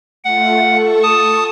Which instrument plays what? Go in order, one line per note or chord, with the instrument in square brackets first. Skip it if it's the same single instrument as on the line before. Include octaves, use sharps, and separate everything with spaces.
[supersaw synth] A3 F4 [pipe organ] F#5
[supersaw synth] A4 C#6
[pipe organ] A5 D#6